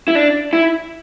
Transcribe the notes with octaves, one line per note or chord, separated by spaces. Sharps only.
E4
D4
E4